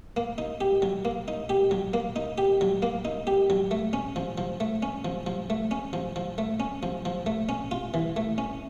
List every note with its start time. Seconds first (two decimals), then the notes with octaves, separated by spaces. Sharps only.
0.17 A#3
0.38 D#4
0.61 G4
0.82 F#3
1.05 A#3
1.28 D#4
1.49 G4
1.71 F#3
1.94 A#3
2.16 D#4
2.38 G4
2.61 F#3
2.82 A#3
3.05 D#4
3.27 G4
3.50 F#3
3.71 A3
3.93 C#4
4.16 F3
4.38 F3
4.60 A3
4.83 C#4
5.05 F3
5.27 F3
5.50 A3
5.71 C#4
5.93 F3
6.16 F3
6.38 A3
6.60 C#4
6.83 F3
7.05 F3
7.26 A3
7.49 C#4
7.71 F4
7.94 E3
8.16 A3
8.38 C#4